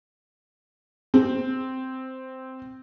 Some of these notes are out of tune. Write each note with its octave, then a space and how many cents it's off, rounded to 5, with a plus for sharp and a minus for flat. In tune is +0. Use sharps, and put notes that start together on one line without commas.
C4 -5